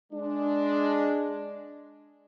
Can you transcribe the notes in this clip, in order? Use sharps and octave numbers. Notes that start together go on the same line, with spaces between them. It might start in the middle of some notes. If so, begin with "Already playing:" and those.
G#3 D4